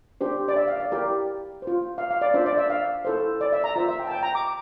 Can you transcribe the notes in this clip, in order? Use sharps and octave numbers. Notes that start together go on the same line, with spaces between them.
D4 G4 C5
D5
E5
F5
D5
E4 G4 A#4 D5
C5
F4
F5
F5
D5
D4 F4 C5 E5
D5
E5
F5
E4 A4 C5
D5
E5
A#5
F4 C5 E5
E5
G5
A5
G5
A#5
D6